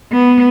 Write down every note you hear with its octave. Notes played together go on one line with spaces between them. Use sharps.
B3